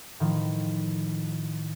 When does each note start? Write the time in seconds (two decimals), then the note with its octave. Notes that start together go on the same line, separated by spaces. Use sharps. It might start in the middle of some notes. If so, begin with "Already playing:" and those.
0.20 A2 D#3 F3